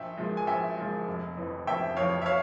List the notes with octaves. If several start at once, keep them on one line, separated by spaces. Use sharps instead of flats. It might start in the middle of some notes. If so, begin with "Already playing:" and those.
Already playing: A#1 E5 G5
A#2 F3 G#3
G#5
A#1 E5 G5
A#2 F3 G#3
F1
F2 E3
F1 E5 G5
F2 E3 C#5 F5
E5
C#5 F5